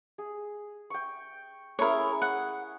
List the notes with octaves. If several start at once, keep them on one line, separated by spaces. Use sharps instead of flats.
G#4
G5 C#6
C#4 E4 G#4 A#4 C#5
F#5